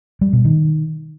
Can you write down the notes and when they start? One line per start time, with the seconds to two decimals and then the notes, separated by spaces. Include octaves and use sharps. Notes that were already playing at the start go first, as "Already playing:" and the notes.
0.21 G3
0.33 B2
0.45 D#3